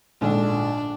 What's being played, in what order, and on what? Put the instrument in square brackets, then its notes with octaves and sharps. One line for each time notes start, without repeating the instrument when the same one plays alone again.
[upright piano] A#1 G#2 D3 [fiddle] D4